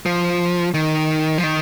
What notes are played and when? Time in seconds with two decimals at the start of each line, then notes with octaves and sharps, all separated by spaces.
0.06 F3
0.74 D#3
1.38 F3
1.43 D#3